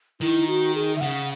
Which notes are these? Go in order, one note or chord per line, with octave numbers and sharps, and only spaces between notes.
D#3 E4
F#4
G#4
E5
C#3 F#5